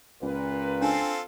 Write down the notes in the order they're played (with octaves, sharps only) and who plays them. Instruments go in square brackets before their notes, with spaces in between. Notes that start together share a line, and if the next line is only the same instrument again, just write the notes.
[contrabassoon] C#2 [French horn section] A#2 B4
[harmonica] C4 F4 A4 [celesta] D4 G#5